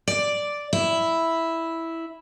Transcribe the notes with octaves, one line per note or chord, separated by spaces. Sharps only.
D5
E4